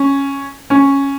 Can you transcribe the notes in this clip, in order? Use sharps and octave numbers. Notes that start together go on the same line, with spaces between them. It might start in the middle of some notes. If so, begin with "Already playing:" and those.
Already playing: C#4
C#4